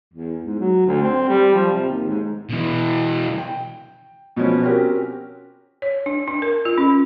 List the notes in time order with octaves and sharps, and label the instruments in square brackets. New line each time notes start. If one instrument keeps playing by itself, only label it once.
[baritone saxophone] E2
G#2
F#3
D2
C4
G3
F3
C3
D#2
G#2
[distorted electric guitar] B2 E3
[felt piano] G5
B2 F3 B3 C#4
C4 C#4 F#4 G4 A#4
[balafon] C#5
D4
D4
A#4
F4
C#4